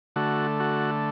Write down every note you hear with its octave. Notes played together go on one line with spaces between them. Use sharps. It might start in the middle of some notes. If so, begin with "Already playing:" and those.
D3 A3 F#4
F#4